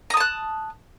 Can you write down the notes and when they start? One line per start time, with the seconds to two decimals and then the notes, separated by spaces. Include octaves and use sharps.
0.10 A#5
0.14 D#6
0.17 A5
0.20 F#6